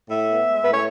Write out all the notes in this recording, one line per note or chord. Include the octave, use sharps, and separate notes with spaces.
A2 E5
B3
G#3
A2 B4
C#5